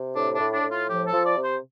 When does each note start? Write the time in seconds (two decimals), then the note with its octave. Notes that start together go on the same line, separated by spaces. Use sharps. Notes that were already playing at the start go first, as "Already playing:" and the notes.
Already playing: C3
0.15 A2 D4
0.33 D4
0.40 A2
0.52 D4
0.64 A2
0.70 F4
0.88 F3 G4
1.06 A4
1.13 F3
1.25 D5
1.37 C3
1.43 C5